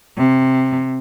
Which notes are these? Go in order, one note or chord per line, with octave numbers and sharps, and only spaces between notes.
C3